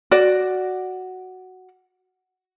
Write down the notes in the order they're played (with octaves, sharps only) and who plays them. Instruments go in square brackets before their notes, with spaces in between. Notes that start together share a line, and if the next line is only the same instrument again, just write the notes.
[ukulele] F#4 D5